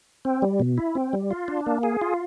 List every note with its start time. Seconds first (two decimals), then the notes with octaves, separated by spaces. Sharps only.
0.25 C4
0.42 G3
0.60 B2
0.78 E4
0.95 C4
1.13 G3
1.31 F4
1.48 D4
1.66 A#3
1.83 G#4
2.01 F4